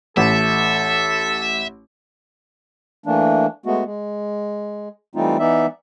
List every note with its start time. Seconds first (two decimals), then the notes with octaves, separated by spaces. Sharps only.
0.17 A1 A4 E5
3.06 E3 A3 A#3 D4
3.66 G#3 A3 B3 F#4
3.85 G#3
5.15 E3 G3 A3 C4 D#4 F4
5.39 E3 B3 D#4 D5 E5